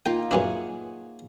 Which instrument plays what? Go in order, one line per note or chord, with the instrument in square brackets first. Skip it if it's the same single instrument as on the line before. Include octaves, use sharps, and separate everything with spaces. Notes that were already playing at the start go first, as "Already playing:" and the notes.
[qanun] A#3 D#4 F4 [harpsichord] G5
[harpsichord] F#2 E3 D4 [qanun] G#4 C#5 F#5